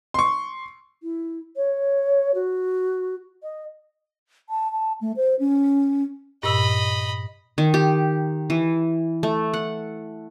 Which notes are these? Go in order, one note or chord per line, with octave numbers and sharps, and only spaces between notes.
C6 C#6
E4
C#5
F#4
D#5
A5
A5
A3
C5
C#4
G2 A#2 D#5 B5 E6
D#3
G4
E3
A3
F#5